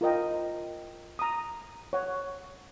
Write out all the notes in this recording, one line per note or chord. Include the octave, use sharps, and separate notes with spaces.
F4 A#4 D#5 G5
A#5 D#6
C#5 F#5